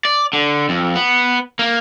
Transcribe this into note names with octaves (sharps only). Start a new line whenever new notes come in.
D5
D3
F2
B3
A#3